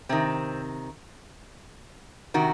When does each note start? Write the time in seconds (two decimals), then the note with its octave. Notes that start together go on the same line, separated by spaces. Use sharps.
0.09 C3 D#3 C4
2.34 C3 D#3 F#4